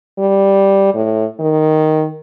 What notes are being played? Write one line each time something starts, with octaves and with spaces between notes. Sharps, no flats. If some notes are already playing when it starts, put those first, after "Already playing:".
G3
A2
D#3